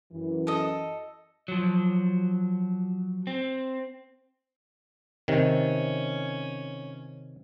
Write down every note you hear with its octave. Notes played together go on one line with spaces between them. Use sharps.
F#2 E3
A4 D#5
F3 F#3
C4
C3 D#3 C#4